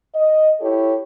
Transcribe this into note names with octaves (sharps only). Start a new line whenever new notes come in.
D#5
E4 G4 A4 C#5